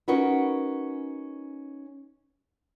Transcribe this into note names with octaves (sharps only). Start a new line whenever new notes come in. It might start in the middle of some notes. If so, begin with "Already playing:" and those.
C#4 D#4 F#4 A#4 B4